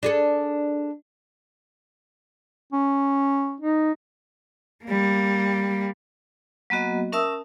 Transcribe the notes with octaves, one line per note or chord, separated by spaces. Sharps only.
D4 G#4 A4
C#4
D#4
G3 A#3
F#3 A#3 B3 F#4 D#5
C#4 A#4 E5 A5 D#6 E6